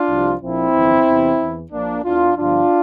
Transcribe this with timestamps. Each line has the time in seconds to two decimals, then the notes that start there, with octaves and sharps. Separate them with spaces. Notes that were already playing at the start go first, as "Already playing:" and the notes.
Already playing: D4 F4
0.08 C2 C3 F3
0.41 A#1 A#2 F3 C4 E4
0.74 G1 F2 E3
1.07 E2 C3 E3
1.39 E2 E3
1.72 A#1 A#2 F3 A#3 D4
2.04 E2 E3 D4 F4
2.36 G1 G2 F3 D4 F4